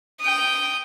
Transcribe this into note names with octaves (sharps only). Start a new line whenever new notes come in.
G5 D#6